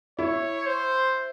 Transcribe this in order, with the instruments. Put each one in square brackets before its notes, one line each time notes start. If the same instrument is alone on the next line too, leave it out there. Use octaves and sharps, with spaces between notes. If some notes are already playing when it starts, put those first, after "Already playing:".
[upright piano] E4 [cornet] C#5
[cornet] C5